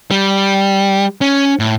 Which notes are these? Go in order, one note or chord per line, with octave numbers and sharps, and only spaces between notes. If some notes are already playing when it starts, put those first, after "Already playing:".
G3
C#4
A2